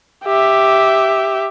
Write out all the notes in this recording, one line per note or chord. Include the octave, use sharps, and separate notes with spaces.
G4 E5